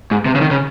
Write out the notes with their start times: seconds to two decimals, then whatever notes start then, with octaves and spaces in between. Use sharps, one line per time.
0.11 G#2
0.26 C3
0.35 C#3
0.41 D#3
0.51 C#3